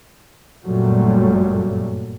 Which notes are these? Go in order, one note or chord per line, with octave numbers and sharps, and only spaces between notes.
G1 F#2 A#2 F#3 G3 A3